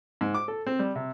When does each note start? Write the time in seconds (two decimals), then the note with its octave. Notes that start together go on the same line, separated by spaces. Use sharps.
0.21 G#2
0.34 D6
0.48 A4
0.66 C4
0.79 G3
0.95 C3